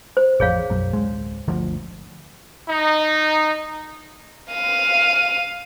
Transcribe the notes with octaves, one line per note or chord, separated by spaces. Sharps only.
C5
A1 F2 G#4 C#5 F5
B1 F#2
D1 G#3
G1 D2 F3
D#4
F5 D#7